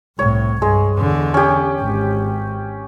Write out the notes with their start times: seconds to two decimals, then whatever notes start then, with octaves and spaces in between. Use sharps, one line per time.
0.19 C2 A2 C#5
0.62 G2 G#3
0.96 E2 D3
1.34 C#4 G4
1.80 G#1